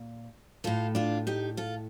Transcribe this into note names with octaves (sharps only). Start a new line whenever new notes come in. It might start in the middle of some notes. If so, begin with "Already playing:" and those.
Already playing: A#2
A2 A3 F4 A4
D4 F4
D#4 G4
F4 A4